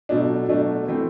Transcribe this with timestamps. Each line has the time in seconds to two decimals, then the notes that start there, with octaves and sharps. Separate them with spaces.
0.09 B2 F#3 A3 D4
0.48 B2 F#3 A3 D4
0.87 E3 A3 C4